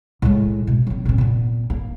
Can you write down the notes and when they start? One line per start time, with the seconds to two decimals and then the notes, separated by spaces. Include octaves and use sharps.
0.22 A2 G#3
0.67 B2
0.87 F#3 C4
1.06 A#2 C4
1.18 A#2 B3
1.70 A#3